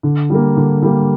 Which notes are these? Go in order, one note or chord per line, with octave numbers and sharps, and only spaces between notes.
D3
G3 A#3
D3
G3 A#3